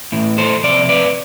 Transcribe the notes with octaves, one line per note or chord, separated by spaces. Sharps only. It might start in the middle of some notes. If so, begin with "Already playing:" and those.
A2 E3
A4 C5
F2 C3 D5
B4 D5